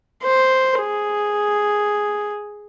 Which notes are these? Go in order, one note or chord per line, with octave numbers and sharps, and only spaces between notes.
C5
G#4